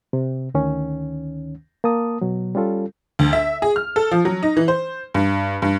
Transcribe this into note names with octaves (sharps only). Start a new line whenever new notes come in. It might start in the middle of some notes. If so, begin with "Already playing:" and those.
C3
D2 D#3 C#4
A#3 A5 D#6
B2 F#3
G3 C#4 F4 A4
D2
E5
G#4
F6
A4
F3
F#3
D#4
E3
C5
G2
G2